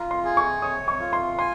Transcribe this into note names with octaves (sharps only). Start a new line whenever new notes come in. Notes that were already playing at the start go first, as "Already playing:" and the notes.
Already playing: F4 A#5
C6
G#4
C#6
C#5 D#6
C#6
F4
C6
G#5 C6